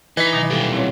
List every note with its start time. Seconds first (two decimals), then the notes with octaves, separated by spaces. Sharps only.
0.17 E3 D#4 B6
0.33 B2 D#3 F#3
0.51 D#3 G3 A4 F5 G5
0.72 C4 E4 C#5